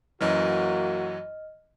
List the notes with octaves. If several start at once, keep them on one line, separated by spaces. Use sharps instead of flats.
F#2 E3 F#3 A#3 F#4 D#5 F6